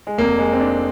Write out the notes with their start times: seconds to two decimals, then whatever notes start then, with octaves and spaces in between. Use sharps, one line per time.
0.07 G#3
0.18 F1 F2 C3 A#3
0.39 G#3
0.53 C4
0.60 D4